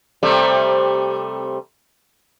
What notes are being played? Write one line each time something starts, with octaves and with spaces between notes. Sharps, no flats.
C3 G3 A3